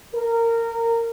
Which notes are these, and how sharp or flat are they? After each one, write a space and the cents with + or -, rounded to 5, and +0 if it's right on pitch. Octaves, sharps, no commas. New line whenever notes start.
A#4 -20